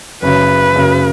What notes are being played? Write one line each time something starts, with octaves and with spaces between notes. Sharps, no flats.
F#1 F#2 C#3 B4
F#1 F#2 C#3